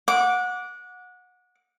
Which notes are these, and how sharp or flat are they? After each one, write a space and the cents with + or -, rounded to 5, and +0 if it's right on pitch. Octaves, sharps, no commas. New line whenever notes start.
F#5 -25 D6 -10